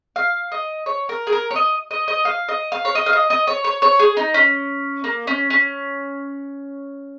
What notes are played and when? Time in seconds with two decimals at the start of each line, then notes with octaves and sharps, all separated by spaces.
0.16 F5
0.52 D#5
0.86 C#5
1.09 A#4
1.27 G#4
1.32 A#4
1.51 C#5
1.56 D#5
1.91 D#5
2.08 D#5
2.25 F5
2.48 D#5
2.72 F5
2.85 C#5
2.95 D#5
3.06 F5
3.13 D#5
3.30 D#5
3.47 C#5
3.64 C#5
3.82 C#5
3.99 G#4
4.17 D#4
4.34 C#4
5.04 A#3
5.27 C#4
5.50 C#4